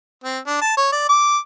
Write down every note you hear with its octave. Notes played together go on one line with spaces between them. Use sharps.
C4
D4
A5
C#5
D5
D6